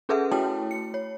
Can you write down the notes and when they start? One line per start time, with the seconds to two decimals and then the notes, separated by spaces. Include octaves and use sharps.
0.09 C#4 G#4 A4 B4 E5 F#5
0.31 A3 E4 F#4 C#5 G5 A5
0.71 C#7
0.94 C#5